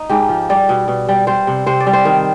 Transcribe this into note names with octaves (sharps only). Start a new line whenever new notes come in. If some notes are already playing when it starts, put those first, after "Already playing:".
Already playing: D#4
G#2 G4
F3
G3 D5
B2
B2
G3
G3 C5
C3
C3 C5
D5
G3
C5
D#3